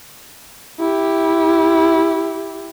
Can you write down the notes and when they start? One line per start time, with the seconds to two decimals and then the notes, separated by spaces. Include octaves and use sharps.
0.79 E4 G4